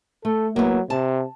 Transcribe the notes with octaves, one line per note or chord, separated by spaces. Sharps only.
A3 A4
F#3 A#3 B3 E4
C3 A5